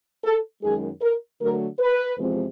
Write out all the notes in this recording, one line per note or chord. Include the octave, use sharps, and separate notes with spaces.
A4
F#2 D#3 G#3 G#4
A#4
D3 F#3 A3 A#4
B4
E2 C3 F3 G#3 C4